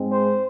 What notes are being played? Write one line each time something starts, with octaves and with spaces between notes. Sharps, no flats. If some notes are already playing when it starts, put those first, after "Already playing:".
Already playing: G#2 G#3 C4
C5